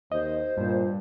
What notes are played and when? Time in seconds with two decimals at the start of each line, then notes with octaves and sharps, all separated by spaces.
0.12 D#2 C5 D#5
0.58 G2 A#2